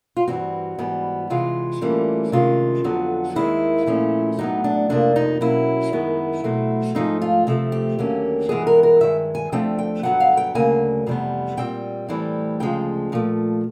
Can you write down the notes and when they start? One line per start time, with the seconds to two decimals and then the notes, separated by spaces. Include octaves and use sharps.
0.17 F4
0.27 G2 E3 G3 C4 F#4
0.79 G#2 E3 G3 B3
1.30 C3 E3 G#3 F4
1.81 A2 E3 G3 A#3 C#4
2.32 C3 D#3 G#3 C#4 F4
2.84 F2 D3 F#3 B3
3.36 D#2 D#3 G#3 C4 E4
3.86 A#2 F3 A3 C#4
4.39 A2 F#3 B3 D#4
4.64 D4
4.89 F2 C3 F3 A#3 D4
5.16 D#4
5.41 B2 F#3 A#3 C#4 E4
5.92 F#2 D#3 G#3 B3
6.44 B2 F#3 A3 C4
6.95 G#2 F3 A3 C4 D#4
7.22 F4
7.47 C3 F3 A3 C4
7.72 G4
7.99 D#2 D3 F#3 A#3 C#4
8.49 G2 E3 G#3 B3 G#4
8.67 A#4
8.83 A#4
9.00 G2 D#3 G#3 E5
9.35 G#5
9.52 D2 D3 F3 A3 C4 G5
9.79 G5
10.03 G2 D3 F#3 B3 F#5
10.20 F5
10.37 G5
10.55 D2 C#3 F#3 A#3 G#5
11.06 F2 C3 E3 G3 B3
11.57 A#2 G3 C4 G5
12.09 A2 E3 G3 C4
12.60 D2 C#3 F3 G#3 G5
13.12 A#2 F3 A3